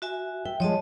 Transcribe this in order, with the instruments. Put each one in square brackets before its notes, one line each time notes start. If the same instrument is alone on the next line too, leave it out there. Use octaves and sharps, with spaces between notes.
[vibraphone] F#4 E5 G#5
[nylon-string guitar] E5 [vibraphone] G5
[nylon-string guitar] F3 G#3 [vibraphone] C#5 D#5 A5